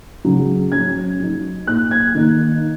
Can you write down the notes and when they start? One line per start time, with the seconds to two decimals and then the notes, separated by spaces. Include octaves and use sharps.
0.24 C#3 F#3 C#4
0.72 F#3 C#4 G#6
1.20 F#3 D#4
1.67 A#2 A#3 D#4 F#6
1.91 G#6
2.15 D#3 A#3 D#4